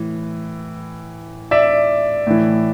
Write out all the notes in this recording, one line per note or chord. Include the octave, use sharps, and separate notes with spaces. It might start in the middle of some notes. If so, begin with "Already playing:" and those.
Already playing: A2 E3
D5 E5
A2 E3